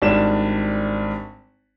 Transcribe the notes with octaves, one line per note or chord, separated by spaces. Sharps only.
G#1 G3 D4 E7